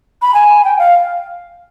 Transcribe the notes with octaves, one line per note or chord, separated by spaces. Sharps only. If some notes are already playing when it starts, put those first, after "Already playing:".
B5
G#5
G5
F5